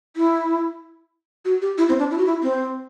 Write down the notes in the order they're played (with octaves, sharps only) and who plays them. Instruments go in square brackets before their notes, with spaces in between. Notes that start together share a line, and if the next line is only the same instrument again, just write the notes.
[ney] E4
F#4
G4
E4
C4
D4
E4
F#4
E4
C4